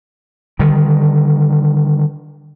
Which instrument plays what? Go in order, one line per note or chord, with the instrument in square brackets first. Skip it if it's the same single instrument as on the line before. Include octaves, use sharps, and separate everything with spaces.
[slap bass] D3 D#3 G3